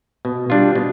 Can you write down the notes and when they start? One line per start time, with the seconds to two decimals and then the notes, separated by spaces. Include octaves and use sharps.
0.25 B2
0.50 G3 D4 F4
0.75 B2